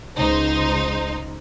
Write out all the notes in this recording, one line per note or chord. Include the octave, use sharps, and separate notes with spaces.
C#2 D#4 C5